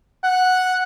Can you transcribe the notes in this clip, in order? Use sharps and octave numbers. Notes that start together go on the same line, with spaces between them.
F#5